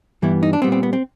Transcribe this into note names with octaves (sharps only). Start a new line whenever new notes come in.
G2 E3 G3 B3 E4
D#4
D4
A#2 G3 B3 C4
C4
B3
C4